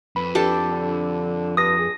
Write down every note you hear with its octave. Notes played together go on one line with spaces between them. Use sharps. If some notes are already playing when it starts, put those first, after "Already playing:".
F2 B4 B5
D4 G4 A4
D3
G2 D#6 A#6
G#4